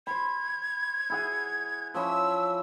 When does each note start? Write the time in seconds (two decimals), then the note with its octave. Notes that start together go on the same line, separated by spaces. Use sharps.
0.07 C5 B5 G#6
1.10 E4 G#4 F#5
1.94 F3 C#4 E4 E6